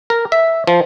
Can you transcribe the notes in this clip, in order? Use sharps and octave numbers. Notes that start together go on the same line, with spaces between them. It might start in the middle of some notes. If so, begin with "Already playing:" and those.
A#4
E5
F3